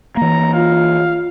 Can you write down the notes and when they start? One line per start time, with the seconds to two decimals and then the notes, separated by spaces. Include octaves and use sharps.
0.17 E3 A#3 A#5
0.54 F4 F5